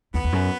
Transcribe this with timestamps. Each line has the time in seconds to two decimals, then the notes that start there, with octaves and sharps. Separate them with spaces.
0.14 E2 B3
0.24 E2
0.32 F#2